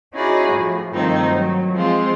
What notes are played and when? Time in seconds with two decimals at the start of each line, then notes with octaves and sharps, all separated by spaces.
0.13 C#4 D#4 E4 F#4 G#4 D5
0.51 A2 F3
0.92 G2 D#3 F3 A3 C4 D#4
1.26 F#3
1.73 F3 G#3 C4 F4